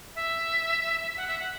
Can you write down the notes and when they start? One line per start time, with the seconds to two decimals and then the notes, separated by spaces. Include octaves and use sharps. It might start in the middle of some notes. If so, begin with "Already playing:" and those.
0.15 E5
1.16 F#5
1.28 E5
1.39 F#5